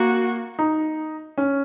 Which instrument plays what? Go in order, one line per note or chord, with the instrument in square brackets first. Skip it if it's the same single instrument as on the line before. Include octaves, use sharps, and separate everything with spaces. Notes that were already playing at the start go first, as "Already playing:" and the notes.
Already playing: [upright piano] A#3 [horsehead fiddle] F#4
[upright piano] D#4
C#4